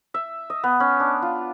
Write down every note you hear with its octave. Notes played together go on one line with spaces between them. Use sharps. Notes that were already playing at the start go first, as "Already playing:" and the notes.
E5
D#5
B3
C#4
D4
F4